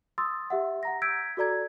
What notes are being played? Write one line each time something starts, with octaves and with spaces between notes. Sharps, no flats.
C6 D#6 E6 A6
G4 E5 F#5
F#5 A#5 A#6
E6 G6 G#6 B6 D7
F#4 A4 D5 A#5 G#6